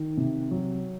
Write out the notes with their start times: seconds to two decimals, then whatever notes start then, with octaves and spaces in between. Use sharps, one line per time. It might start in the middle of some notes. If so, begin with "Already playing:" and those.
Already playing: D#3
0.17 C3
0.51 F#3